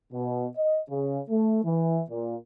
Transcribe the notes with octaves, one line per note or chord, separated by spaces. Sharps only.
B2
D#5
C#3
A3
E3
A#2